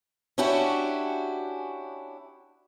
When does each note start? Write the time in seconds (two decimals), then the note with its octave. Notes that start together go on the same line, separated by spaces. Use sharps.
0.38 C#4 D4 E4 F#4 G4